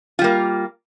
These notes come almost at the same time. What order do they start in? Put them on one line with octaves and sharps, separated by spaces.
F4 G3 A#3